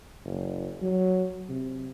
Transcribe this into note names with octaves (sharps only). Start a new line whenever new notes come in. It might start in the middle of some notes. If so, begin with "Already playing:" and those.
F#1
F#3
C3